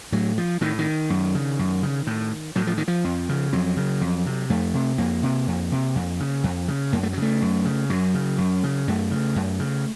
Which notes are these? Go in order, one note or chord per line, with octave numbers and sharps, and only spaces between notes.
A2 F#3
F3
A2 D#3
D#3
F#2
C#3
F#2
C#3
A2
A2 F#3
F3
D#3
F3
F2
C#3
F2 F#3
C#3
F2
C3
F2 A3
C3
F2 A#3
C3
F2
C3
F2
C#3
F2
C#3
F#2 A#3
A3
F#3
C#3 A3
F#2
C#3
F#2 F#3
C#3
F#2
C#3
F#2 A3
C#3
F#2
C#3